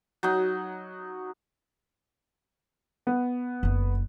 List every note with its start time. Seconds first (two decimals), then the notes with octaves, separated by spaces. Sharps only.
0.23 F#3 D#4
3.07 B3
3.63 F#1 D3